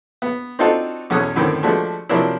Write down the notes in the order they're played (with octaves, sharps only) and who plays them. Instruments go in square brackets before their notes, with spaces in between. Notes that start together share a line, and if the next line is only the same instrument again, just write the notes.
[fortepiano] B3
C4 D4 D#4 F4 F#4 A4
B1 E2 C#4 A4 D#6 F#6
F#2 A2 D3 D#3 C4
F3 G#3 A3 D4 F#4
C3 F3 F#3 A#3 D4 E4